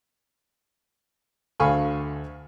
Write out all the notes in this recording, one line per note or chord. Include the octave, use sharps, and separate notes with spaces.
D2 A4 F5 G#5 B5 C#6